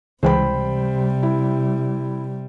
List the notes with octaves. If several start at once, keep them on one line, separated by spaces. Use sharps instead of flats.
C#2 C3 E3 G3 G#3 C5 G5 B5
E4